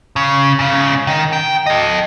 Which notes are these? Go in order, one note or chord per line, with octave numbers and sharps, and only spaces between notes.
C#3
G#2 C#3
D#3
G5
A4 D#5